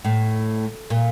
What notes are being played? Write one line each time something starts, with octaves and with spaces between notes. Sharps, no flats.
A2
A#2